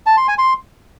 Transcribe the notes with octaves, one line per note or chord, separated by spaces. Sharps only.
A5
C6
G#5
C6